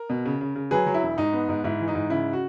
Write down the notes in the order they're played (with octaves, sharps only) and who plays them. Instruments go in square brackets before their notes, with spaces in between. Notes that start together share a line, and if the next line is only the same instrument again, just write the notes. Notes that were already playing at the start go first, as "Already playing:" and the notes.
Already playing: [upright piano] A#4
B2
C#3
C#3
C#3
F#3 G#4 B4
F#3
E4
E1
G#2 D#4
B3
G#2
G#2 E4
E3
D#4
G#2
C#3 E4
F#4